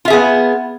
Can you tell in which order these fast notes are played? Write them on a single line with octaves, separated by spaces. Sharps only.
F4 E5 G#4 B3